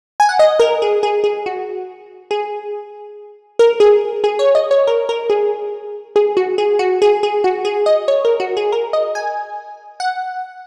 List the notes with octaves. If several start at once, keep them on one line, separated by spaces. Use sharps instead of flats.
G#5
F#5
D#5
A#4
G#4
G#4
G#4
F#4
G#4
A#4
G#4
G#4
C#5
D#5
C#5
A#4
A#4
G#4
G#4
F#4
G#4
F#4
G#4
G#4
F#4
G#4
D#5
C#5
A#4
F#4
G#4
A#4
D#5
G#5
F#5